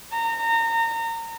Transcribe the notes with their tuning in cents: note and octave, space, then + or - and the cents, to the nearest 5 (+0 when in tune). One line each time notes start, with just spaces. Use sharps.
A#5 -30